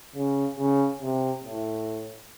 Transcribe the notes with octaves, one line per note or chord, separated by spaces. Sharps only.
C#3
C#3
C3
A2